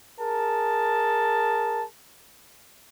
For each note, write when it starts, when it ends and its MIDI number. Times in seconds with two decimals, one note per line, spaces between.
0.20 1.84 68
0.20 1.84 70
0.20 1.84 81